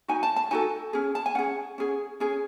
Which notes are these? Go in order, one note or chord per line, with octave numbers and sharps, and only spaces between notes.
D#4 F#4 G#5
A5
A5
D#4 F#4 A4 G#5
C#4 G#4
A5
G#5
C#4 G#4 F#5
C#4 G#4
C#4 G#4